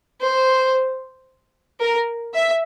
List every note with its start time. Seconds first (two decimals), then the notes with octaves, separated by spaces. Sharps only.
0.24 C5
1.81 A#4
2.33 E5